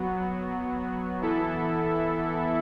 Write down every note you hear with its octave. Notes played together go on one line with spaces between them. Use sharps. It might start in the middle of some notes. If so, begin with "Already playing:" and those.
Already playing: F#3 B3 F#4
E3 B3 E4 A4 E5